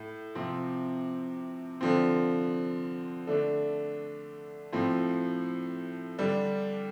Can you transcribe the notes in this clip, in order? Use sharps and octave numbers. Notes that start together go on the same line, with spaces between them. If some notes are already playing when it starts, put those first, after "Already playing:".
Already playing: A2
C3 F3 C4
D3 F3 C4
D3 A3 D4
A2 F3 C4
D3 G3 D4